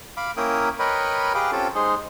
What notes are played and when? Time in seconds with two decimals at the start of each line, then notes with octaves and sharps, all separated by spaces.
0.17 F5 B5 D6
0.37 A#3 C#4 E4 A#4 G5 D#6
0.79 A#4 B4 C#5 D#5 G5 B5
1.34 G4 G#4 B4 F5 G5 D6
1.52 C4 C#4 F4 G4 A4
1.75 G#3 D#4 G#4 C5